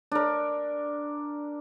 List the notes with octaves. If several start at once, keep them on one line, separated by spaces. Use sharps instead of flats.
D4 A#4